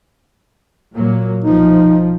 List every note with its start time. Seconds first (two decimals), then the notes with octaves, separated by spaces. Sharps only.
0.93 A#2 F#3 A#3
1.45 B1 F3 D#4